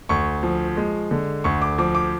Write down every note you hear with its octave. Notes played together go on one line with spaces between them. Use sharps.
D2 C#6
F3
G#3
D3
D2 C#6
D6
F3 D6
D6